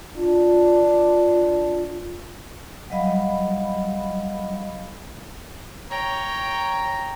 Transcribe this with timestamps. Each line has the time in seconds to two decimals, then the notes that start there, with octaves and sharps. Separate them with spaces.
0.16 D4 F4
2.90 F#3 G3 D#5 F5 B5
5.90 C#5 G5 A#5